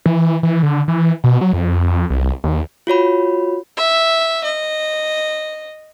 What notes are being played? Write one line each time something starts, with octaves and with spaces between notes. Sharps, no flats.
E3
E3
D3
E3
B2
F#3
F2
F2
C2
D#2
F4 F#4 C#5 B5
E5
D#5